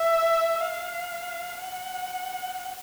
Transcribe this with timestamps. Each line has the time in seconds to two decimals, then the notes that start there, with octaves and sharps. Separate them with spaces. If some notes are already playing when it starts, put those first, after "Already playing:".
Already playing: E5
0.61 F5
1.61 F#5